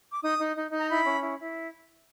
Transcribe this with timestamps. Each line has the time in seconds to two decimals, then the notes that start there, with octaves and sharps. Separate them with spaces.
0.13 D6
0.22 D#4 D#6
0.39 D#4
0.56 D#4
0.71 D#4
0.78 A#5
0.89 E4 B5
1.05 C#4
1.21 E4
1.39 E4